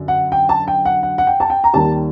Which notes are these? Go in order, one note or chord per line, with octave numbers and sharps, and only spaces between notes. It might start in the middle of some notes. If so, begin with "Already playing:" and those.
Already playing: F#2 D3
F#5
G5
A5
G5
F#5
F#5
F#5
G5
A5
G5
A#5
D#2 D#3 G3 A5